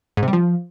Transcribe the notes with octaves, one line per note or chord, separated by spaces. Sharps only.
G#2
C3
G3
F3